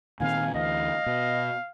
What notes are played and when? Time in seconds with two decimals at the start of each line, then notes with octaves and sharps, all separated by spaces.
0.20 A#2 D#3 C4 F5 G#5
0.54 D2 E3 D#5 F5
1.06 B2